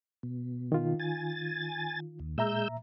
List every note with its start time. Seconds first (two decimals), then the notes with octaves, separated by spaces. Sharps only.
0.23 B2
0.72 D#3 F4
0.99 G#5 A6
2.20 D#2
2.38 A#2 G#3 E5 A#5 E6 G6